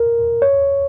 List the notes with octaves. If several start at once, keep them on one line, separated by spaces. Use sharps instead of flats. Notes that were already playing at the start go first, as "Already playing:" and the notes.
Already playing: A#4
C#5